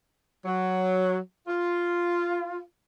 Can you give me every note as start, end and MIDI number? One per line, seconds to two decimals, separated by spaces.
0.45 1.17 54
1.48 2.60 65